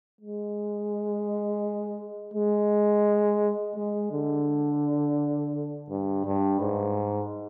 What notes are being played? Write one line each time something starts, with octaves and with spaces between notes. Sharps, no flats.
G#3
G#3
G#3
D3
G2
G2
G#2